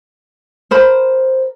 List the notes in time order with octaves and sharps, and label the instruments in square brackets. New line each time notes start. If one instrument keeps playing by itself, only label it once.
[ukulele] A#4 C5 B5